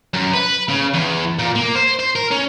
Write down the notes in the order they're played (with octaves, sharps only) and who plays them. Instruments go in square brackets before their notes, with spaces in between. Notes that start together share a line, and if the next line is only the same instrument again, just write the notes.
[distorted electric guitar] F#2
B4
C#3
E2
A#2
A#3
C5
C5
A#4
C#4